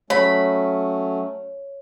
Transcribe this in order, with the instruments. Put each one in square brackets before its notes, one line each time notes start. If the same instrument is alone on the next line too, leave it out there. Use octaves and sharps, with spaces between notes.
[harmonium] F#3 A3 C#4 [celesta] C#5 [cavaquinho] B5